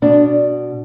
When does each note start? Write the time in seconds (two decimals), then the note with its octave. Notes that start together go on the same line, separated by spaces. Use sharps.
0.02 B2 D4